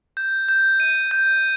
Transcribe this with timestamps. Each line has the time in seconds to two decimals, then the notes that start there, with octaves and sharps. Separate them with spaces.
0.17 G6
0.49 G6
0.80 D#7
1.11 G6